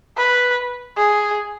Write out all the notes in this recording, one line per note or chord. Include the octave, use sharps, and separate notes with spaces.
B4
G#4